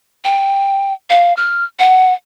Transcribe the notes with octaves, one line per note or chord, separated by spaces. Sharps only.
G5
F5
F6
F#5